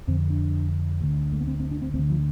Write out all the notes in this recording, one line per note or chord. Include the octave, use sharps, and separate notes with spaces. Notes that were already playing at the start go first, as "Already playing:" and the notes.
F2 D3 C4
D4
D2 D3
A3
B3
C4
C4
D4
C4
D2 C4
D3
F3